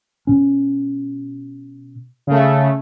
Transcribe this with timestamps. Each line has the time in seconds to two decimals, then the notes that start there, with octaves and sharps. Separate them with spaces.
0.27 B2 C#4
2.27 C#3 A3